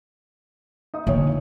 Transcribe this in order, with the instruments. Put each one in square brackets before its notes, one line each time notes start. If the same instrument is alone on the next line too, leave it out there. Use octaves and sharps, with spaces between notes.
[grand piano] D#4 E5 D#6
[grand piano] A#2 C#5 [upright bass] D3